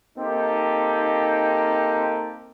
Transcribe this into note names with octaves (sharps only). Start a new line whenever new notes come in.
A#3 C4 D#4 G4 A4